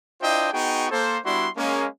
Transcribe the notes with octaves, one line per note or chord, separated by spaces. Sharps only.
D4 E4 F4 C5 D#5 G5
B3 D#4 F#4 G#4 G5 C#6
A#3 A4 C5
G3 B3 D4 E4 F#4 C6
G#3 A#3 C#4